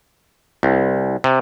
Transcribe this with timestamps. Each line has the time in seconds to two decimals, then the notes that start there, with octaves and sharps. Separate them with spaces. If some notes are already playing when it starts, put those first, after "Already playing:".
0.63 C2
1.24 C3